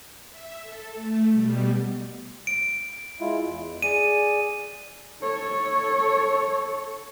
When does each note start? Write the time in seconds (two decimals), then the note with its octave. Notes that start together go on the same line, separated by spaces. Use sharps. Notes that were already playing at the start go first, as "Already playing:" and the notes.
0.28 E5
0.62 A4
0.95 A3
1.31 B2 G3
2.47 D7
3.20 G#3 E4 F4
3.45 E2
3.82 G#4 D5 D#7
5.22 A4 C#5